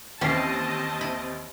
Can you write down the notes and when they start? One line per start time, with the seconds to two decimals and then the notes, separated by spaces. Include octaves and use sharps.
0.21 D#2 E3 C4 C#4 G4 D#5 A5 C7
1.01 E4